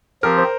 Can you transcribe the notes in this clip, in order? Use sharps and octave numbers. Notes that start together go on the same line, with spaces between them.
F3 C4 G4 A#4
C5